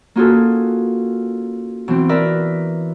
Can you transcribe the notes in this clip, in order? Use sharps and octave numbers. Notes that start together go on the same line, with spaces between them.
A#3 C#4 F4 F#4 G#4 A4
B2 E3 C4
A#4 B4 D5 E5 A#5